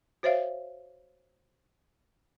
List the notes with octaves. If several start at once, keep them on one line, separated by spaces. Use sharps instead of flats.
F#4 C5 C#5 E5 F5